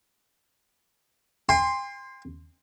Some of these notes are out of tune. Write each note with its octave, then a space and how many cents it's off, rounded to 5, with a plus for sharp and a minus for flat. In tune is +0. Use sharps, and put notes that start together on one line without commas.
G5 +45 C6 +0